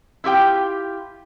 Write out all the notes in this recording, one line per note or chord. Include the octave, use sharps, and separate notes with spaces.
E4 F4 G4 G5